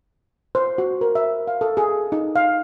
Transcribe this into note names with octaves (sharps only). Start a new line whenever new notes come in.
C5
F#4
A#4
E5
F5
A4
G#4
D#4
F5